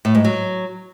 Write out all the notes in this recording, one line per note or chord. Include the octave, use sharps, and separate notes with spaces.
A2
G#2
F#3